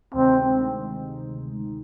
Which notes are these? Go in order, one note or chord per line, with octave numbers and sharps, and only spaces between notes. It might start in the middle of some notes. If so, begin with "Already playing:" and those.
D2 C3 D#3 G#3 C4 D#4